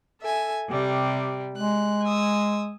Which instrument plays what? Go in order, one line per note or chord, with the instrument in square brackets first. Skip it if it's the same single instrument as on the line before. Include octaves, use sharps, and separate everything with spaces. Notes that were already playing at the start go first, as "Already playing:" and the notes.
[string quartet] A4 E5 G#5
C3 G3
[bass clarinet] G#3 [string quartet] F#6
[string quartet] G#5 D#6 E6